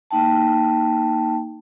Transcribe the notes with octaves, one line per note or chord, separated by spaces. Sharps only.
A#3 D#4 G5 A5